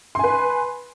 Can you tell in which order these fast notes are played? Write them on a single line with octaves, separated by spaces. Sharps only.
C6 G#5 B4